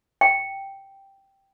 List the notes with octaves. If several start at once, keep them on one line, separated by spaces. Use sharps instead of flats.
G5